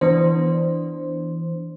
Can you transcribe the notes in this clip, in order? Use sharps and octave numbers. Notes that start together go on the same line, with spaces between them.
E3 B3 D4 C5